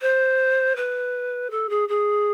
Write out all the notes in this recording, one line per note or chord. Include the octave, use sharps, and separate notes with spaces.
C5
B4
A4
G#4
G#4